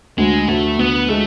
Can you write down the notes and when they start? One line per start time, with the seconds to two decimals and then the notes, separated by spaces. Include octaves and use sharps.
0.18 D2 G#3
0.48 D2 A3
0.79 D2 B3
1.09 G#3 A3